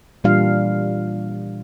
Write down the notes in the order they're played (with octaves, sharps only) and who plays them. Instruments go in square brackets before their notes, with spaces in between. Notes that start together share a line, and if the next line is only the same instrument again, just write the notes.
[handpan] A#2 E3 G3 D4 F4 F5